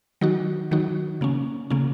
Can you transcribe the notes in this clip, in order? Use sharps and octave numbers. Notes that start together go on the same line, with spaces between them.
D#3 F#3 D#4 F#4
D#3 F#3 D#4 F#4
C#3 A#3 C#4
C#3 A#3 C#4